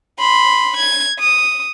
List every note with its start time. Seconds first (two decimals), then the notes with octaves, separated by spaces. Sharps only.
0.19 B5 C6
0.77 G#6
1.20 D#6